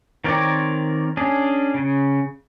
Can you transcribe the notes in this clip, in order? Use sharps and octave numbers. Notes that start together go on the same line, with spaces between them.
D#3 C4 A#4 C#5 D5
C#4 D4 G#4
C#3